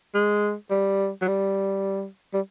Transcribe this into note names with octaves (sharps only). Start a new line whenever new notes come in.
G#3
G3
F#3
G3
G3